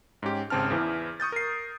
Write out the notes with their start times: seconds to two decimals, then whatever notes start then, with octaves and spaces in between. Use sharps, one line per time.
0.23 G#2 C#4 G4
0.50 G#1 C#3 C4 A5 F6
0.71 E2 E3 E4
1.20 C#6 D#6 G6 A6
1.32 A#4 C7